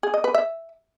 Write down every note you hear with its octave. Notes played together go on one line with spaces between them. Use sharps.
G#4
D#5
B4
E5